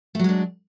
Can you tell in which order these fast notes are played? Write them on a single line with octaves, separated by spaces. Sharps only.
A3 F#3 G#3 D4